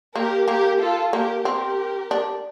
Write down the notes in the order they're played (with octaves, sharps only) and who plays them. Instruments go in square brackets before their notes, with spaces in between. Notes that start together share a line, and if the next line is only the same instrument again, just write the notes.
[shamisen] A#3 [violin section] G4 A#4
[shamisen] A#3 [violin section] G4 A#4
[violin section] F4 A4
[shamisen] A#3 [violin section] G4 A#4
[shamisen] C4 [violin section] G4 A#4
[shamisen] D4